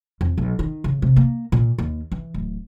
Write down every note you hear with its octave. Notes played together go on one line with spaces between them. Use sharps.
F2
B1
D#3
C#3
C3
A#3
A#2
D#2
E3
D1